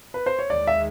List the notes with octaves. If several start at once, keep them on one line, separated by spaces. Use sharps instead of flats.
B4
C5
C#5
D#2 D#3 G#3 D5
E5